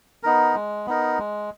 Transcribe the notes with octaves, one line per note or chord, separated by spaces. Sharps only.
B3 D#4 A#4
G#3
B3 D#4 A#4
G#3